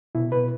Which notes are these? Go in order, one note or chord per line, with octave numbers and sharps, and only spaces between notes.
B2 E4
B2 B4